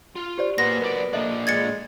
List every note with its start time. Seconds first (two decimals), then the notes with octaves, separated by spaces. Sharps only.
0.16 F4
0.38 G4 C5 D5
0.58 B2 A#3 B3 C6 A#6
0.81 B1 A#4 D5
1.13 A#2 D4 A4 D#5 E5
1.47 G#3 G#6 A6 C#7